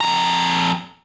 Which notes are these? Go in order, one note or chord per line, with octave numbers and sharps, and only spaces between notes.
F2 A#5